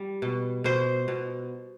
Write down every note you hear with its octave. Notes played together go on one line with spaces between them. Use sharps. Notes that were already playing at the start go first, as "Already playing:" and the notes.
Already playing: G3
B2
B2 C5
B2